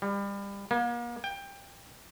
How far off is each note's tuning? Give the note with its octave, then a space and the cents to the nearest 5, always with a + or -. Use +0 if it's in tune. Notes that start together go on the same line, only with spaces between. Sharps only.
G3 +30
A#3 +40
G5 +20